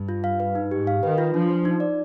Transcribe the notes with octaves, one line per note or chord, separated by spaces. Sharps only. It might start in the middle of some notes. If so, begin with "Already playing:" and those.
Already playing: G2
F4
F5
B4
D#4
G#2 G4
F5
D#3 B4
F4
F3 D4
C5
D#4
D5